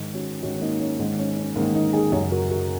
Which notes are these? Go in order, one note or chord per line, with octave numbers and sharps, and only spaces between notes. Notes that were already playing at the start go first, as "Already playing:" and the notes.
Already playing: G#2 D#3
C#4 F#4
G#2 D#3 C#4 F#4
C#4
A#3 D#4
C#4
G#2 D#3
C#4
C#4
G#2 D#3 A#3 D#4
A#3 D#4
D#4 G#4
F#2 C#3 G#4 C#5
F#4 A#4
F#4 A#4